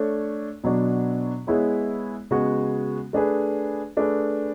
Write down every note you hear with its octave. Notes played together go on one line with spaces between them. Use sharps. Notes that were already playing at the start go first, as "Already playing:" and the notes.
Already playing: A3 D4 A4 C#5
B2 F#3 B3 D4 F#4
G#3 B3 E4 G#4 C#5
C#3 G#3 B3 F#4
A3 D4 G#4 B4
A3 D4 G#4 B4